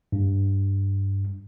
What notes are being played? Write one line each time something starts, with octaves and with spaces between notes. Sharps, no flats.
G2